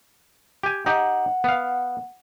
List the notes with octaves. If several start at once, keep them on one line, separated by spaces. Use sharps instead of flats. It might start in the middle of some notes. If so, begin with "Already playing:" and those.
G4 G#5
D#4 G4 F#5
B3 F5